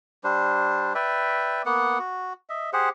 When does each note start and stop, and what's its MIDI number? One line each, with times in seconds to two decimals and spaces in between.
0.24 0.93 55
0.24 0.93 62
0.24 0.93 72
0.95 1.62 71
0.95 1.62 74
0.95 1.62 76
0.95 1.62 79
1.65 1.98 58
1.65 1.98 59
1.65 1.98 78
1.99 2.33 66
2.49 2.70 75
2.49 2.70 76
2.73 2.89 67
2.73 2.89 68
2.73 2.89 72
2.73 2.89 78